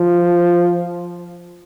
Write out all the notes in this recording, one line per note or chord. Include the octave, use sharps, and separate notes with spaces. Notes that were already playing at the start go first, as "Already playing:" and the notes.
Already playing: F3